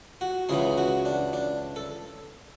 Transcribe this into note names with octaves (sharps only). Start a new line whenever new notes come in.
F#4
C#2 C#3 E3 G#4
F#4
D4
D4
A4